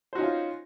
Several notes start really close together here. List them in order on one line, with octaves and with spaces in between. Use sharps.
C5 F#4 D#4 C#4 F4